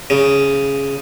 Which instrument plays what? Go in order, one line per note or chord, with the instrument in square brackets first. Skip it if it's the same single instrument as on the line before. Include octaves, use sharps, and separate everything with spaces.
[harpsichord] C#3